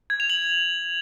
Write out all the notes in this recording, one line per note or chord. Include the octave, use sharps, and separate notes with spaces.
G#6
F7
F#7